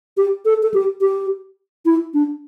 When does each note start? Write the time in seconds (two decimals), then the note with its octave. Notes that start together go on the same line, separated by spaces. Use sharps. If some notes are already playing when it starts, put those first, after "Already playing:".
0.17 G4
0.45 A4
0.63 A4
0.74 G4
1.01 G4
1.86 E4
2.14 D4